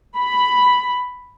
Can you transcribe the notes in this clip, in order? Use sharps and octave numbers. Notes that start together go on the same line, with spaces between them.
B5